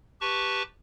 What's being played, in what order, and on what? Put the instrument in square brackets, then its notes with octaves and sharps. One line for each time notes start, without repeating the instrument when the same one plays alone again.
[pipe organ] G4 B4 A5 C#6